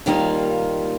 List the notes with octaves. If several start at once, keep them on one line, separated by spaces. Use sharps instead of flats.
D#2 D#3 G3 A#3 F4